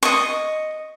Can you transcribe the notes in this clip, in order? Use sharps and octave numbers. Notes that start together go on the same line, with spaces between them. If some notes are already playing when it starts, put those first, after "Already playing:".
D#5 C#6